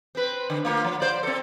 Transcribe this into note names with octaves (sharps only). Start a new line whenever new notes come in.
C4 B4
D3
A3 A#3 F4
F3
C5 D5
C4 A4